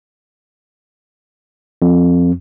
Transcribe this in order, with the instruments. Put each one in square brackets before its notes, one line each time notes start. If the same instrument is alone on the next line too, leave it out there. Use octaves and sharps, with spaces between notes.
[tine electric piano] F2